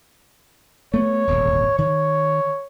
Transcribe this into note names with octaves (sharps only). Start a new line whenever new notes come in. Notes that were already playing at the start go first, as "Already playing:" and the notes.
A3 B3 C#5
D#1 G#1 D2
D#3 C#5